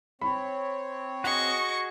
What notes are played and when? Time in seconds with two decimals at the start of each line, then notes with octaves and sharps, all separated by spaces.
0.21 C4 C#5 B5
1.24 F#4 G#4 D#5 C#6